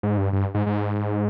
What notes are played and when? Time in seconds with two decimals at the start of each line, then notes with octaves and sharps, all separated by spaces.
0.03 G#2
0.17 G2
0.33 G2
0.55 G#2
0.67 G#2